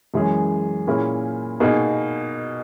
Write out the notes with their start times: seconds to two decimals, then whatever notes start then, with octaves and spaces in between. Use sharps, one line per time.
0.14 F#2 E3 G#3 C#4 G#4
0.87 A#2 A#3 C#4 E4 G#4
1.60 B2 A#3 D#4 G#4